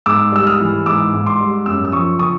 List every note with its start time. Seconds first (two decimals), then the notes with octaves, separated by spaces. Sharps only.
0.06 G#2 D6 E6
0.32 G3 E6
0.47 D#6 F6
0.60 E3
0.86 G#2 D6 E6
1.14 G#2
1.26 C6 D6
1.40 G3
1.66 F#2 D6 E6
1.85 E6
1.92 F3 C#6 D#6
2.19 D3 C#6 D#6